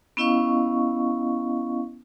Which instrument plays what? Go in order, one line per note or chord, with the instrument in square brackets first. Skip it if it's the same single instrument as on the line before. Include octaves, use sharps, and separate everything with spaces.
[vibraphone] B3 C#4 E4 D#5 F5 C#6